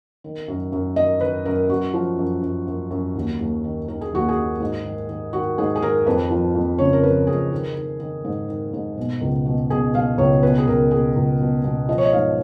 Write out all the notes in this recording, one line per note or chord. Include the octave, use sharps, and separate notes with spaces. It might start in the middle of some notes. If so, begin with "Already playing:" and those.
D#3
F#2
F#2
D#3 D#5
D#3 B4
F#2 A#4
F#2 F#4
F3
F#2
F#2
F#2
F#2
D#2
D#2
D#3
D#3 A#4
G#4
D#2 F#4
G#4
D#3
G#2
D#3
D#3
D#3 F#4
G#2 G#4
G#4
D#3 A#4
F2 B4
F3
F2
C#3 C#5
A#4
F3 B4
F2 G#4
D#3
D#3
D#3
G#2
D#3
G#2
B2
C#2
B2
B2 G#4
B2 F5
C#2 C#5
B2 B4
G#4
C#2 A#4
B2 G#4
C#2
B2
B2
F3 D#5
C#5
D#5
G#2 F5